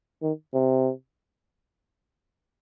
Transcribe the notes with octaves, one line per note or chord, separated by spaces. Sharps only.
D#3
C3